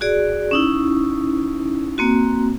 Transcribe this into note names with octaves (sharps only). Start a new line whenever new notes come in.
F#4 G#4 D5
C#4 D#4 E4
A#3 C4 F#4